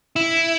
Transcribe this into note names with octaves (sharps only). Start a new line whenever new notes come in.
E4